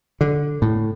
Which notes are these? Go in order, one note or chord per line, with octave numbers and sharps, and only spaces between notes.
D3
A2